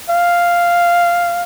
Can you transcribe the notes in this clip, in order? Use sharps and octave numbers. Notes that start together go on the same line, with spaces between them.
F5